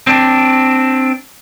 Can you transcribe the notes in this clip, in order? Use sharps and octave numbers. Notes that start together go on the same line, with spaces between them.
C4 D4